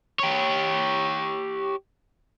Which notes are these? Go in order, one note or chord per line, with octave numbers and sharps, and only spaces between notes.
G4 C#5